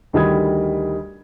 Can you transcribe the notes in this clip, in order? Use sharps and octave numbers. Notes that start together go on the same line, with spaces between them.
D2 D#3 G3 B5 D#6 G#6